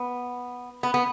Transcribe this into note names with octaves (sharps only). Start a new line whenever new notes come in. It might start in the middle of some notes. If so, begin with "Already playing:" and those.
Already playing: B3
B3
B3